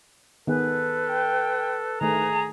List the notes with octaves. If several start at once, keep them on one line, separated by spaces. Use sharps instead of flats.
D#3 B3 G#4 A4 B4
G5
D#3 A3 G#4 A#5